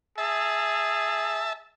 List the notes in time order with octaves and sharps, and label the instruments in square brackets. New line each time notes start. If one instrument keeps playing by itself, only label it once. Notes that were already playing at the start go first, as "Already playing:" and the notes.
[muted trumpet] G#4 [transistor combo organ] E5 A5